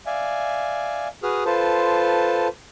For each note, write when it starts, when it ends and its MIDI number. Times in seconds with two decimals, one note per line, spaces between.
0.06 1.08 74
0.06 1.08 76
0.06 1.08 77
0.06 1.08 80
1.23 1.44 66
1.23 1.44 68
1.23 1.44 71
1.23 1.44 87
1.23 1.44 89
1.46 2.48 65
1.46 2.48 69
1.46 2.48 71
1.46 2.48 72
1.46 2.48 81